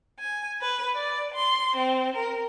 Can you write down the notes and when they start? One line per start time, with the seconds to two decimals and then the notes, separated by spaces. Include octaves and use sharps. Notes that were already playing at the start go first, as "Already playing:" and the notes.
0.18 G#5
0.61 B4
0.96 D5
1.33 C6
1.75 C4
2.14 A#4